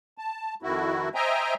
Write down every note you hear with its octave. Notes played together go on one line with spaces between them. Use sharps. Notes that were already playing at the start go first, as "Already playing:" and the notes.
A5
F2 D#3 E4 F#4
C5 D#5 E5 G5 G#5 A#5